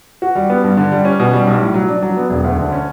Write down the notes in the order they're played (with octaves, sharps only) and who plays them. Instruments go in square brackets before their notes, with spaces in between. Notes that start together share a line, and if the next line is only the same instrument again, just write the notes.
[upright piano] F#4
G3
B3
G2
D3
G3
C#4
B2
G3
B1
A2
F#3
D4
F#3
B3
E1
D2
D3
C#4